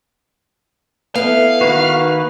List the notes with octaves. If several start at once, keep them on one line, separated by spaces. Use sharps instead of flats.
B3 E4 A4 F5
D#3 A#3 F#4 B4